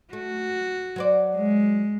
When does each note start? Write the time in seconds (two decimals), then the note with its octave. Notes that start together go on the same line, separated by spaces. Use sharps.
0.13 A3 F#4
0.96 F#3 C5 D5
1.35 G#3